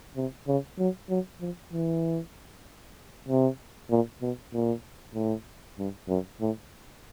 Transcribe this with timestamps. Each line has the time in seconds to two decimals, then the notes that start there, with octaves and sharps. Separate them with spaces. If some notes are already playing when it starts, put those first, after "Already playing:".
0.16 C3
0.47 C#3
0.79 F#3
1.10 F#3
1.40 F3
1.73 E3
3.29 C3
3.90 A#2
4.22 B2
4.53 A#2
5.15 A2
5.78 G2
6.08 F#2
6.41 A2